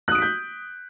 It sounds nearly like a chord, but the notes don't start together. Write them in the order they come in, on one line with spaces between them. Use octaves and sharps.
F#6 D#6 D7 B6 G6